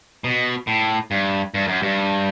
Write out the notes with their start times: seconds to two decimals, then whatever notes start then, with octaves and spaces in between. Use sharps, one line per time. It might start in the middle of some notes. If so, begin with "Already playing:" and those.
0.24 B2
0.67 A2
1.11 G2
1.54 G2
1.68 F#2
1.83 G2